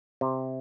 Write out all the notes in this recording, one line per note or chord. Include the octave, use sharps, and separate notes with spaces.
C3